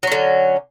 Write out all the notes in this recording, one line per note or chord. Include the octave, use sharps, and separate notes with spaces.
D3 F#3 C#4